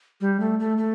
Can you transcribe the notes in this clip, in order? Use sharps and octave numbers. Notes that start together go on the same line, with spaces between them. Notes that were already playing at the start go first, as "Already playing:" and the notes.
G3
A3
A3
A3